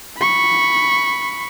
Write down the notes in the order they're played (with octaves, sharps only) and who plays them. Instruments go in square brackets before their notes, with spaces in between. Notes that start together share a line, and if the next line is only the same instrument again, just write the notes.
[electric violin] B5 C#6